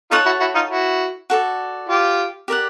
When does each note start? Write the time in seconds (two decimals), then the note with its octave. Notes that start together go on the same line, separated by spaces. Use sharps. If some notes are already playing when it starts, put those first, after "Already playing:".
0.11 D#4 F4 A4 C#5 F#5 A5
0.25 E4 F#4
0.40 E4 F#4
0.55 D#4 F4
0.70 E4 F#4
1.30 F#4 A4 D5
1.89 F4 G4
2.48 G4 A#4 D5 F#5